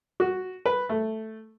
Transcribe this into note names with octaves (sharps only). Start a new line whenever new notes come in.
F#4
B4
A3